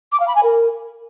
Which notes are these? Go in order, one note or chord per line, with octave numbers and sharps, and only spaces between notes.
D6
F5
B5
G#5
A#4